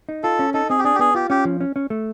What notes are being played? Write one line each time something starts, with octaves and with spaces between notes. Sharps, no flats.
D#4
F4 A4
C#4
D#4 A4
C4 G#4
G4
D4 G#4
G4
B3 G#4
F4 G4
C#4 G4
F3
C#4
C#4
A3